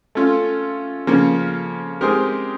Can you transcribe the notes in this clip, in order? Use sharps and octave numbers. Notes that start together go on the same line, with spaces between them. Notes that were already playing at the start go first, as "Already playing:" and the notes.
A3 C#4 F4
C#3 F3 A#3 C#4
G#3 C4 D#4 G4 A#4